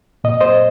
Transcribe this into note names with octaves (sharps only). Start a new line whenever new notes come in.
A#2 D#5
C5 D#5